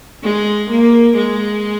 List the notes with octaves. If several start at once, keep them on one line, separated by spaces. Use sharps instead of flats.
G#3
A#3
G#3